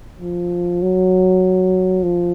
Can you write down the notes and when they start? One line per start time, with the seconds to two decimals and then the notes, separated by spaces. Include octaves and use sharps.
0.20 F3
0.82 F#3
2.03 F3